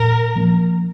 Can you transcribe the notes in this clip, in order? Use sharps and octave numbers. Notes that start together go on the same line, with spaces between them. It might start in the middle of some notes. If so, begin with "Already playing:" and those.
Already playing: A#2 A#4
F3 A#3 C#4